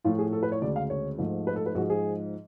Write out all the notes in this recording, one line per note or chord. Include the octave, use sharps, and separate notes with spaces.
A2 F3 A3 F4
G#4
A4
B4
C#5
D2 C#3 G#3 D5
F5
C#5
G#2 F3 A3
B4
A4
B4
G#2 F3 G#3 F#4
G#4